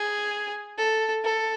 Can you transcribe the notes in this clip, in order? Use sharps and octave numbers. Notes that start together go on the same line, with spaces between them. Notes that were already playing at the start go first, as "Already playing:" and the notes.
Already playing: G#4
A4
A4